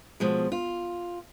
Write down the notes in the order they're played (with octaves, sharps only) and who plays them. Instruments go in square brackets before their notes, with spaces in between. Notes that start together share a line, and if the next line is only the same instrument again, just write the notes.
[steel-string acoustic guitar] B2 F3 G#3
F4